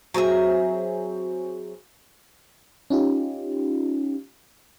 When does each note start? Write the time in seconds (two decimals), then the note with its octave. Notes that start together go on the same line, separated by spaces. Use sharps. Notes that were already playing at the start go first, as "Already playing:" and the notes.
0.14 F#3 C4 G#4 E5
2.90 C#4 D#4 F4 G4